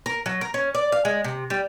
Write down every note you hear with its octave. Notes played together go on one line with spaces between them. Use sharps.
A#4
F#3
A#4
C#4
D5
F5
G#3
C3
G3